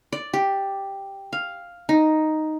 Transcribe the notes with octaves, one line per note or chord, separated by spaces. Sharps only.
D5
G4
F5
D#4